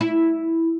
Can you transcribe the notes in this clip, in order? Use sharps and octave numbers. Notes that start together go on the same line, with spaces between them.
E4